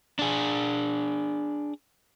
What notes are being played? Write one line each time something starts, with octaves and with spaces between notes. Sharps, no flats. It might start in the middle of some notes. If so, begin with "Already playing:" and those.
D4 G#4